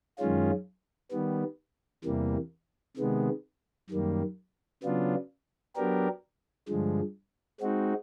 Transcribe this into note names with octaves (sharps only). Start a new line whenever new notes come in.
F#2 D#3 G#3 C#4 F4
D#3 G3 B3
E2 C3 E3 G3 A#3
C3 D#3 G#3 B3
F#2 D#3 G3 A#3
C#3 F#3 B3 D4 F4
F#3 B3 D4 G4 A#4
G2 D3 F3 G#3
G#3 C4 D#4 F#4